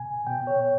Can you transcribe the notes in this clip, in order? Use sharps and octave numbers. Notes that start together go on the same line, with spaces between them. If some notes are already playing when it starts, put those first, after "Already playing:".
Already playing: B2 G#5
B2 G5
C#5